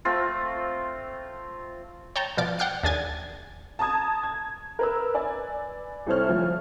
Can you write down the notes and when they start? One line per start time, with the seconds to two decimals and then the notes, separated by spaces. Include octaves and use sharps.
0.05 A3 C4 F4
2.16 C#5 G5 A5 A#5
2.37 B2 F3 D5 D6 D7
2.59 F#5 G5 D6 F6 C7 D7
2.83 D#2 D4 G#4 G#5 A6
3.79 A5 A#5 D#6 G#6
4.23 G#6
4.79 A#4 B4 E6
5.14 B4 D5 G#5
6.06 C2 E4 A4 C5 C#5 F6
6.29 D2 F3